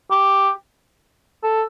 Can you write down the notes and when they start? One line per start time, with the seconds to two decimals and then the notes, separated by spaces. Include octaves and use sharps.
0.11 G4
1.44 A4